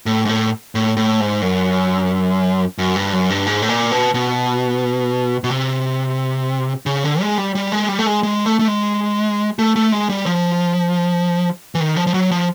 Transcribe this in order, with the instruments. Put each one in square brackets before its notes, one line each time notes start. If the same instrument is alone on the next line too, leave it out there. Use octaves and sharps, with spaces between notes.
[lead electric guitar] A2
G#2
A2
A2
A2
G#2
F#2
F#2
G2
F#2
G2
G#2
A2
A#2
B2
B2
B2
C3
C#3
D3
G#3
G3
G3
G#3
G3
A3
G#3
G#3
A3
A3
G#3
A3
A3
G#3
G3
F3
E3
D#3
F3
F3
F#3
F3